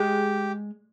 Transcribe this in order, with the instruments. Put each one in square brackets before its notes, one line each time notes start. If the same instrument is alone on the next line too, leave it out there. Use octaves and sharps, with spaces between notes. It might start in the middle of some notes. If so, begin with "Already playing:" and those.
Already playing: [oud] G#3 [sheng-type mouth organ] G4